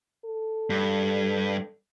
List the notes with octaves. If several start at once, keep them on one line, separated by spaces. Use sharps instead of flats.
A4
G2